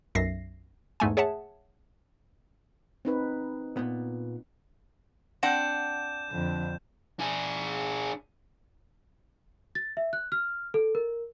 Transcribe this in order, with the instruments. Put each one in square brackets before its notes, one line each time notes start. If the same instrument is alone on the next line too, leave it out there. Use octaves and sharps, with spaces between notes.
[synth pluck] B1 F#2 E5 A#6 C7
E2 G#2 A3 G#5
G#4 C#5 E5 F#5 A5
[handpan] C4 D#4 B4
[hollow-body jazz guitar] A#2 B3
[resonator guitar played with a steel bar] C4 D4 F#5 [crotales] G6 E7
[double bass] F2 D3
[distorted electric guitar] D4 G#4
[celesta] A6
E5
F#6
F6
A4
A#4